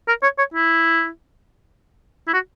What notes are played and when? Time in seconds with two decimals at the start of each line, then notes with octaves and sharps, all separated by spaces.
0.08 A#4
0.23 C#5
0.38 C#5
0.54 E4
2.27 E4
2.34 F#4